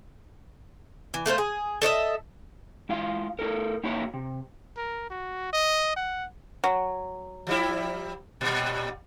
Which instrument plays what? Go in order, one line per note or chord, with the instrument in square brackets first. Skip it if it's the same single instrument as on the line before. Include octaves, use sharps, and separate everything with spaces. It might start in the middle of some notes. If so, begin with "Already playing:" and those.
[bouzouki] E3
A3 F4 A#4 C5
G#4
A4 C#5 D#5 E5
[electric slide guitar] G#3 E4 F4 F5
A3 E4 A4 A#4
A#3 D#4 E4 F#4 C#5
C3
[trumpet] A#4
F#4
D#5
F#5
[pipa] F#3
[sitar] F3 G3 E4
A#2 G3